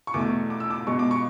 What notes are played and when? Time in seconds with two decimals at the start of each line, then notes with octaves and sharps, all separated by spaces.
0.07 C#6
0.14 E2 B2 A3 D6
0.50 D6
0.60 E6
0.71 D6
0.87 B2 G#3 C#6
0.99 D6
1.11 C#6